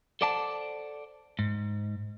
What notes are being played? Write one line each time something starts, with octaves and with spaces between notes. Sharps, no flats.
A4 C5 D5 F#5 A5
G#2